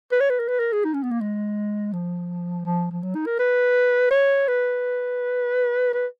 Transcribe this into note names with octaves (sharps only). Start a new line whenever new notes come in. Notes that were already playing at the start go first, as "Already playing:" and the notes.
B4
C#5
B4
A#4
B4
A#4
G#4
D#4
C#4
B3
A#3
G#3
F3
F3
F3
F#3
D#4
A#4
B4
C#5
B4
B4